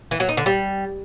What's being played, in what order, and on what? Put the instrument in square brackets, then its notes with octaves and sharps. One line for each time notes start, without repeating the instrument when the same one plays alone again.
[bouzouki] E3
F#3
D#4
D3
G3